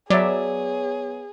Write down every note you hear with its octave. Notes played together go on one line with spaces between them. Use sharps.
F#3 B3 G#4 C#5 D5 E5